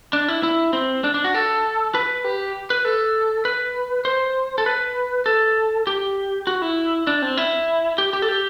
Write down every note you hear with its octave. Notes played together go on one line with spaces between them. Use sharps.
D4
E4
E4
C4
D4
D4
F#4
A4
B4
G4
B4
A4
B4
C5
A4
B4
A4
G4
F#4
E4
D4
C4
E4
G4
G4
A4
G4